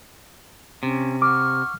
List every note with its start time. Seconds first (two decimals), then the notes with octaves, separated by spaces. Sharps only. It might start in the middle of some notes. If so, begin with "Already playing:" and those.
0.83 C3 C#4
1.22 F#5 C#6 D6 F6